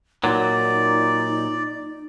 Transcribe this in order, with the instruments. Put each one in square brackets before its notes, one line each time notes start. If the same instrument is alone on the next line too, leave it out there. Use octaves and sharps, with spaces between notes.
[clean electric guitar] A#2 F#3 [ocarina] D#4 [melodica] D5